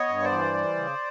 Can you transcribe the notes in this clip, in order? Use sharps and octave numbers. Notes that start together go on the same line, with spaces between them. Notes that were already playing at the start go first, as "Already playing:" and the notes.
Already playing: B3 C#5 D#5
G2
C5 D5
E3
G3
C#3